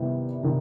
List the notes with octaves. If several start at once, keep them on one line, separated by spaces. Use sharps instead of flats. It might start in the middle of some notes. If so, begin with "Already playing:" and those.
Already playing: C3 D#3 G3 B3 E4
C3 D#3